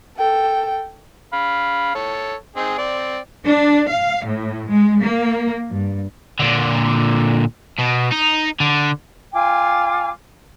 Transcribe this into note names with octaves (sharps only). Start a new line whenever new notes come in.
A4 G5
F5 B5
A4 C#5
C4 D#4 G#4
C4 D5
D4
F5
A2
G#3
A#3
G2
A#2 D3
B2
D#4
D3
F4 G5 G#5 D6